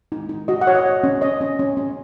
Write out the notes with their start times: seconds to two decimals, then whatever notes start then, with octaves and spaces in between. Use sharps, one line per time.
0.12 D#4
0.29 D#4
0.48 F#4 D#5
0.61 F#5
0.67 C#5
0.75 D#5
0.86 C#5
1.03 C#4
1.21 C#5 D#5
1.41 C#4
1.59 C#4
1.77 C#4